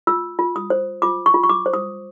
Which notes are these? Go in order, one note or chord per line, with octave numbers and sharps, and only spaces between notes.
F4 E6
F4
D#6
C5
F4 D6
C#6
F4
C#6
D6
C5
D#6